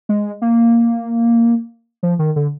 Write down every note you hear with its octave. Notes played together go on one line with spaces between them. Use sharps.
G#3
A#3
F3
D#3
D3